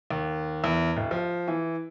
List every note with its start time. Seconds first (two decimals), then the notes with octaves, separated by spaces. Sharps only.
0.11 D#2
0.64 E2
0.97 D1
1.11 F3
1.48 E3